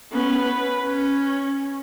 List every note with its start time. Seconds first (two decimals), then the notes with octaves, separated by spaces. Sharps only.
0.12 B3 C#4
0.44 B4
0.83 C#4